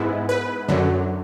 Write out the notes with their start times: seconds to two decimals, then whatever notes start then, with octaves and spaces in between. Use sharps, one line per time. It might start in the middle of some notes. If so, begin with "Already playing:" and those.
Already playing: G#2 G#3 B3 E4
0.29 B4
0.68 F#2 D3 F#3